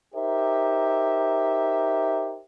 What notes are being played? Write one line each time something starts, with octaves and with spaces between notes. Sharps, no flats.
D#4 G4 A#4 C5 E5